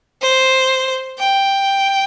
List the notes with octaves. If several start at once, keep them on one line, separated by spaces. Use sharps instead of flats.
C5
G5